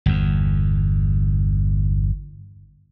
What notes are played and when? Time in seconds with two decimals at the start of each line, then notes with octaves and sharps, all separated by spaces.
0.06 G1 E2